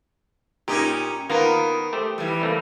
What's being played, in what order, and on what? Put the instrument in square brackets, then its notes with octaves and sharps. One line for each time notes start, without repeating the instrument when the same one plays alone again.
[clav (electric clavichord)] A#2 [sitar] C#4 D#4 G4
[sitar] D#3 B3 [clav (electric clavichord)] A#3 F4 A#4
[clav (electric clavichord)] A3 G4 C5
[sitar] E3 G3
[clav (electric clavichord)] C2 A3 A#3